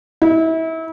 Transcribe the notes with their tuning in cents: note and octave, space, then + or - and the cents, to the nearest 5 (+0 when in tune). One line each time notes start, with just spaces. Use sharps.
E4 -30